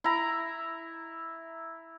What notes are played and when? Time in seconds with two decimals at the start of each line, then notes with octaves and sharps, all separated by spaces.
0.04 E4 A#5